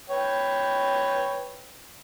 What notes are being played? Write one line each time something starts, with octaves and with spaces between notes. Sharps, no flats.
B4 C#5 G5